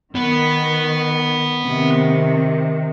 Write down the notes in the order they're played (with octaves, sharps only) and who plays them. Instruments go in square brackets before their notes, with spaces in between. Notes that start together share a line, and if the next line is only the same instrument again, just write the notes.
[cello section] D#3 [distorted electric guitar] B3
[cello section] C3 D#3